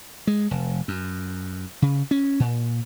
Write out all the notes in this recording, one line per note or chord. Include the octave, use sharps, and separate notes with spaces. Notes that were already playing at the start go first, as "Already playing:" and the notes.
G#3
F1
F#2
C#3
C#4
A#2